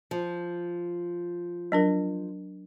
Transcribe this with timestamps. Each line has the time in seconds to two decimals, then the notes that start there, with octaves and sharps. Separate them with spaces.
0.11 F3
1.72 F#3 D4 A#4